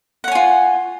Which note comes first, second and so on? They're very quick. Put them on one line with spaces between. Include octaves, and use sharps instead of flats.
F#5 C#5 G#5 F4